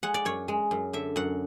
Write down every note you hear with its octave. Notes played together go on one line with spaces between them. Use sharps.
G#3 F#5
D5
F#2 C#5
G#3
F#2
D3 E5
F#2 F#5